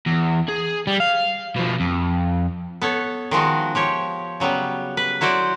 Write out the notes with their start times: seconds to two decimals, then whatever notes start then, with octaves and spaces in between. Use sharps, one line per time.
0.07 E2
0.48 G#4
0.87 G3
1.00 F5
1.56 B2 F3
1.80 F2
2.81 B3 A4 C#5
3.31 D#3 F3 G#3 F#4
3.75 F3 G4 C#5
4.40 C#3 F#3 G3 B3
4.97 B4
5.21 F#3 E4 F#4 C5 D5